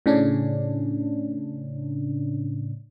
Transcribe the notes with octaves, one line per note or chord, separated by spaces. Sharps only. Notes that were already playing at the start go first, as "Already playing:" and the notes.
A2 C#3 C#4 D4